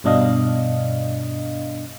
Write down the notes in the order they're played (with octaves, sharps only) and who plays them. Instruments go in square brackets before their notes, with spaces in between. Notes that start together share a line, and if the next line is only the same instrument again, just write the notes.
[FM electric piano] G2 B2 D4 D#5 F5